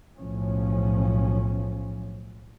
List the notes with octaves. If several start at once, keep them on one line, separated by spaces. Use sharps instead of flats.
B1 A2 F3 C#4